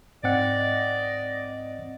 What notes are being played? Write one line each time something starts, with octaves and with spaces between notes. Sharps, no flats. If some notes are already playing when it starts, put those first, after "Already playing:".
G#2 C4 D5 D#5 F#5